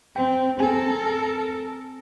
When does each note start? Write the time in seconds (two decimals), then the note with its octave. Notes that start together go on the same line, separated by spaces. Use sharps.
0.16 C4 G5
0.60 C4 A4 A#4 G#5